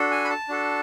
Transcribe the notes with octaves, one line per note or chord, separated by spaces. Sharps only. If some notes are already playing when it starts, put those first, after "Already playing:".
Already playing: D4 F#4 A4
G#5
B5
A5
D4 F#4 A4